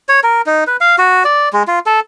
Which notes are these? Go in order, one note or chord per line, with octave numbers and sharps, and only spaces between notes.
C#5
A#4
D#4
B4
F5
F#4
D5
G#3
F4
A4